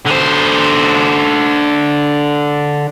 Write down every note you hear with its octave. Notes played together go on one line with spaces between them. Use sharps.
D3 C5